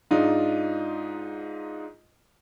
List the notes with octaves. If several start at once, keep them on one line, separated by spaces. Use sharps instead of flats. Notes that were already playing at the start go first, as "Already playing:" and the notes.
G#2 D4 D#4 F4